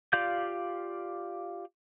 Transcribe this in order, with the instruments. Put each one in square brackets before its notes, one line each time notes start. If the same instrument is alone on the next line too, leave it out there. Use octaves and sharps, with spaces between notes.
[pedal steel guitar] F4 G4 D5 F5 G6